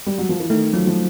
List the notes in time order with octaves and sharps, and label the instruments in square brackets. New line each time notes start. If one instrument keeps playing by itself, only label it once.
[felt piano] G3
F#3
F3
E3
[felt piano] D#3 [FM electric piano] A3
[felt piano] F3 [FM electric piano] F#3
[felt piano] F3